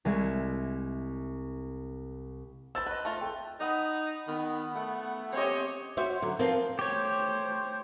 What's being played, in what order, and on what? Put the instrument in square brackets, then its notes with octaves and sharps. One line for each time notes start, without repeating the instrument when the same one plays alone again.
[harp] C2 G#3 E5 G#6 E7
[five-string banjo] C4 B4 [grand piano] E6 A6
[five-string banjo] B4 D#5 [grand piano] F#6
[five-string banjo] A3 F4
[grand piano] A4 G5
[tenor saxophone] D#4 [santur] D#5 F#5 B5
[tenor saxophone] D#3 [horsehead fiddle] B3
[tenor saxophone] A3 [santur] F#5
[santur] C4 C#4 G4 [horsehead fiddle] C#5 D#5
[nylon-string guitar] F#4 G4 C5 C#5 E5
D3 F#3
F3 B3 C4 F4 A#4
[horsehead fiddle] A3 C5 [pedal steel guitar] G4 C#5